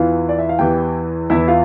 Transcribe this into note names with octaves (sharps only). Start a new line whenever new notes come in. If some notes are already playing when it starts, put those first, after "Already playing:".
Already playing: E2 E3 F4 F5
D5
E5
F5
E2 E3 G4 G5
E2 E3 E4 E5
F4 F5